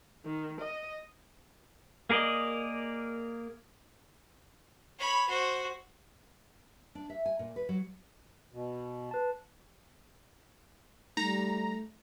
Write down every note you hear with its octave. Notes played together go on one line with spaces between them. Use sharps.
D#3
D#5
A#3 G#4 A#4 D5 D#5
C#5 B5
F#4 C5
D4
E5
G#5
A#2
B4
F#3
B2
B4 A5
G3 A3 D#4 A#5